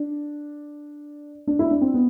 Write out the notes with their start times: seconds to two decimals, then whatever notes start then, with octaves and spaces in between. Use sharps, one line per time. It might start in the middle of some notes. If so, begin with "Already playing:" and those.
Already playing: D4
1.47 D4
1.59 E4
1.71 D4
1.81 C4
1.94 B3